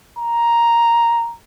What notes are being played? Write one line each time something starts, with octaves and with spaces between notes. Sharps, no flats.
A#5